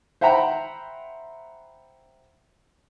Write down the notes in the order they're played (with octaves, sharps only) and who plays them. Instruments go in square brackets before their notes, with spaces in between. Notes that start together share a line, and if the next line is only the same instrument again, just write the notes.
[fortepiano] C5 E5 F#5 G5 A#5 B5